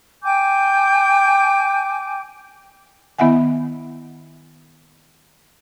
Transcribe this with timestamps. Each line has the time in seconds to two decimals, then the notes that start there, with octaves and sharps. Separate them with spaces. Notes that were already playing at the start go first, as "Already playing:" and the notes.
0.23 G5 G#5 D6 G6
3.19 D#3 B3 E4 E5 F#5 G#5